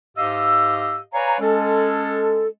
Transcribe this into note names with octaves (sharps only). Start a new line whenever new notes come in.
G#2 G4 D#5 F5 E6
B4 C#5 D5 F5 G#5 A#5
G#3 C#4 A4